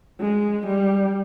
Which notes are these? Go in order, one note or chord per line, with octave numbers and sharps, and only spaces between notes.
G#3
G3